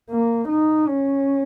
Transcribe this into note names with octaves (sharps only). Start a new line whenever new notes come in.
A#3
D#4
C#4